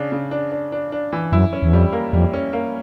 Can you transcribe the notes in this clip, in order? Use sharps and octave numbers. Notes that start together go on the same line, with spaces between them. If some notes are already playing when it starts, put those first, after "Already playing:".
Already playing: C#3 D4
C#3
D4
D4
D4
D4
E3
F#2 E4
C#4
E2
F2 G3
A#3
F2 G3
C#4
A#3